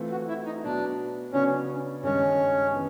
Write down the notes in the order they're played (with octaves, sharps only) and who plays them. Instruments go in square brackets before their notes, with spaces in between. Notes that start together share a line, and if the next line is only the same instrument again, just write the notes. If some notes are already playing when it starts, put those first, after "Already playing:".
Already playing: [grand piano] E3 A3 C4 F4
[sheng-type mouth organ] F#4
E4
D#4
[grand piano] B2 F#3 B3 [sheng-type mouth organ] D4
[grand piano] C#3 F#3 B3 D4 F#4 [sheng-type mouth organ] C#4
[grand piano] G2 D#3 G#3 [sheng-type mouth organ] C#4
[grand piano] E3 B3